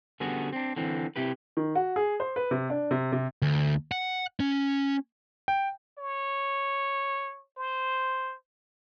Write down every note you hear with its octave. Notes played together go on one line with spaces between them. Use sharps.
D3 G3 B3 C#4 F#4 G#4
C4 D4
D3 E3 C4
C3 E4 G4 B4
D#3
F#4
G#4
C5
B4
C3
D4
C3
C3
D2
F#5
C#4
G5
C#5
C5